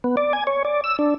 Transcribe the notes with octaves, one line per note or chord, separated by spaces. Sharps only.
B3
D5
G#5
C#5
D5
E6
D4